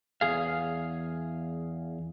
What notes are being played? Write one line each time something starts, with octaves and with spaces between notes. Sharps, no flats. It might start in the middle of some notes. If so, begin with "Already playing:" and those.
E2 G#4 F5